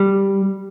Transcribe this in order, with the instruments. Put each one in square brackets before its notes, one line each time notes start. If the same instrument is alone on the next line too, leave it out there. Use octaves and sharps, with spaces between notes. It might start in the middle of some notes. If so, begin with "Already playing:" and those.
Already playing: [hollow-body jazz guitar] G3